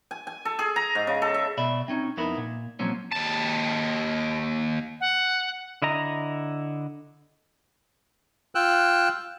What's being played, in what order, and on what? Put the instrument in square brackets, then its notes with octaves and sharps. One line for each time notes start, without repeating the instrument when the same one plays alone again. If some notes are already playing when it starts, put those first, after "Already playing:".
[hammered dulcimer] G#5
G#5
A4
G#4
A#5
G#2
C#3
A4
E5
[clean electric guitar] B2 D5 E5 B5
C4 C#4 D#4
F2 B3 D#4 E4 A#4 B5
A#2
A#2 F3 F#3 A#3 C4 C#4
[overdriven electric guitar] D#2 A5
[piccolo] F#5
[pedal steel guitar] D3 E4 D#5 A#5
[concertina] F4 G5 E6 F#6